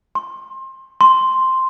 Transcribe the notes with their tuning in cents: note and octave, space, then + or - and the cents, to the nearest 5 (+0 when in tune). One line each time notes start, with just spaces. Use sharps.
C6 +25
C6 +0